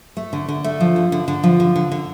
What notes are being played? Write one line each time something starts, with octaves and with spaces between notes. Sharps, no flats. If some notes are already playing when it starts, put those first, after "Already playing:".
A3
D3
D3
A3
F3
D3
D3
D3
F3
D3
D3
D3